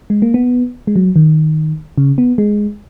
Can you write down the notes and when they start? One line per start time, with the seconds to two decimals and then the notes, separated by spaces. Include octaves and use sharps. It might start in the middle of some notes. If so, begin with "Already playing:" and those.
0.10 G#3
0.22 A#3
0.34 B3
0.87 G#3
0.96 F#3
1.16 D#3
1.98 C#3
2.18 B3
2.38 G#3